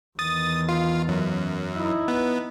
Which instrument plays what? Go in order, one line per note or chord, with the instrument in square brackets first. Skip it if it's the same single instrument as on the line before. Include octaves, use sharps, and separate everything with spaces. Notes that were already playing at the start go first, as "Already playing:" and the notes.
[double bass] E2 D#3 [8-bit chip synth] D#6 A6
[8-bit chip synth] F4
F#2
[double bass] D#4 E4
[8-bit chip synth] B3